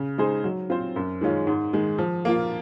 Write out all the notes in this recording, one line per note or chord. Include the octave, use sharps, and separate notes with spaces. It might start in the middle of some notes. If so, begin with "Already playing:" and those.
Already playing: C#3
G#3 D#4 G#4 C5
F#3
C4 F4 C5
F#2
D#3 G#3 C#4 F4
G#2
D#3 G#3
F3
A#3 F4